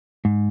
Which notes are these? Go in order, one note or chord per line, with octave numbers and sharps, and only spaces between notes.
G#2